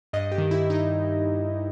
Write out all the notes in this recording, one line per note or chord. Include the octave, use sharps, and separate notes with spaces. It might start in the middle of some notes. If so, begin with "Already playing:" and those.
G2 D#5
G4
D#3
E4
D#4